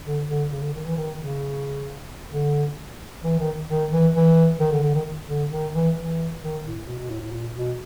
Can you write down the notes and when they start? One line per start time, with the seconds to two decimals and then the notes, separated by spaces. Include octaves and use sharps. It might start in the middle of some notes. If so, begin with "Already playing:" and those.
0.06 D3
0.28 D3
0.52 C#3
0.62 D3
0.74 D#3
0.85 E3
0.97 D#3
1.19 C#3
2.32 D3
3.24 E3
3.39 D#3
3.69 D#3
3.92 E3
4.15 E3
4.60 D#3
4.72 D3
4.83 D3
4.94 D#3
5.28 D3
5.51 D#3
5.74 E3
5.97 E3
6.42 D#3
6.65 A2
6.87 B2
6.99 B2
7.10 A2
7.22 A2
7.33 A#2
7.56 B2